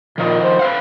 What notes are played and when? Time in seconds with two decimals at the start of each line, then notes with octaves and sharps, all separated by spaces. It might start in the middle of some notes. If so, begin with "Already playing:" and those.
0.18 A#2 D#3 F3 D#4
0.43 C5
0.59 B4 F5 F#5